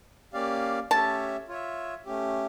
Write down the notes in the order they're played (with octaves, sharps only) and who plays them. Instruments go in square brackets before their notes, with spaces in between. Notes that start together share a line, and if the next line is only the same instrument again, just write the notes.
[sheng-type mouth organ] A#3 C#4 G4 D5 F5
[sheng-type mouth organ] A3 C#4 G4 C#5 E5 [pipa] A5
[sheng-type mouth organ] F4 C#5 E5
A3 C#4 G4